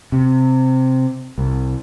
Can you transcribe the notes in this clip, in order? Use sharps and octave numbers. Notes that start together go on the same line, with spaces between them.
C3
C2